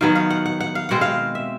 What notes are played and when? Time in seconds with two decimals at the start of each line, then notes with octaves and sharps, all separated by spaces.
0.01 D#3 F#3 B3 F5
0.15 F5
0.30 F#5
0.46 F#5
0.60 F#5
0.75 F5
0.89 B2 G#3 C4 F#5
1.01 F5
1.35 E5